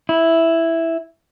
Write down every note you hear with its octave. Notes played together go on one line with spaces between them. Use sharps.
E4